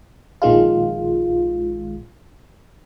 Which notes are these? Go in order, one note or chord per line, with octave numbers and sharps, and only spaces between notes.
A#1 D#3 G#3 F4